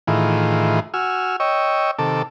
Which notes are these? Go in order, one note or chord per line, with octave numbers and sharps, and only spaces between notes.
A2 D#3 E3 F4 G#4
F#4 G#5 E6 F6
C#5 D#5 G5 C#6 E6
C3 D#3 A4 A5 D6